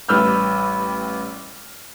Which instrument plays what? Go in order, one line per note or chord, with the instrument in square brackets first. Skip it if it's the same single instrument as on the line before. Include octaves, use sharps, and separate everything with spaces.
[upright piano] A1 G3 B4 E6 F6 G6